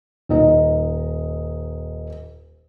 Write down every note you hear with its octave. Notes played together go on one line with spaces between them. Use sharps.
D#1 D#4 D#5